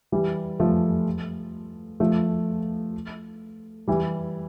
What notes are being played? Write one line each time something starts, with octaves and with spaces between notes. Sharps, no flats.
E3 G3
F3 A3
F3 A3
E3 G3